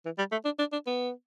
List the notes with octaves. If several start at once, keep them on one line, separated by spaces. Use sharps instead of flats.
E3
G3
A3
D4
D4
D4
B3